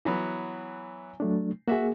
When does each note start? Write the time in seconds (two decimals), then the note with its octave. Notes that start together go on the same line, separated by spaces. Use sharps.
0.05 E3 F#3 B3
1.20 F#3 A3 D4
1.68 A#3 F#4 G#4 E5